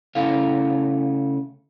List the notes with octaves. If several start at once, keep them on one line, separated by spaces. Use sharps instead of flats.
C#3 A3 E4 F5